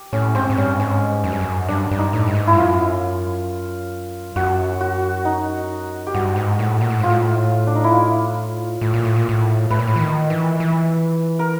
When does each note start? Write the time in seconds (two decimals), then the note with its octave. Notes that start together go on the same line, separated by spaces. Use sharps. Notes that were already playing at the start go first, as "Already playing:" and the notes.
Already playing: G4
0.13 A2 C#4
0.35 G#2 C4
0.50 G#2
0.57 G2 C#4
0.80 G#2 C#4
1.24 F#2
1.32 G2
1.41 F#2
1.68 G2 D4
1.91 G2
1.98 D#4
2.13 A2
2.27 G2
2.35 G#2
2.47 E4
2.53 G2
2.57 F#2 F4
4.36 F#2 F#4
4.81 F#4
5.25 D#4
6.07 G4
6.14 G2 F#4
6.36 G#2
6.59 A2
6.81 A#2
6.90 A2
7.00 G#2 F4
7.10 A2
7.67 D4
7.75 D#4
7.84 E4
7.92 F4
8.81 A2
8.94 A#2
9.05 A2
9.16 A#2
9.29 A2
9.71 A2 B4
9.79 A#2
9.87 A2
9.96 E3
10.00 D#3
10.30 E3
10.60 E3
11.39 A#4